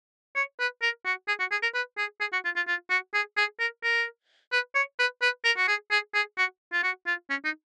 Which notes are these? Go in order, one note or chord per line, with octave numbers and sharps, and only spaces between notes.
C#5
B4
A#4
F#4
G#4
F#4
G#4
A#4
B4
G#4
G#4
F#4
F4
F4
F4
F#4
G#4
G#4
A#4
A#4
B4
C#5
B4
B4
A#4
F#4
G#4
G#4
G#4
F#4
F4
F#4
F4
C#4
D#4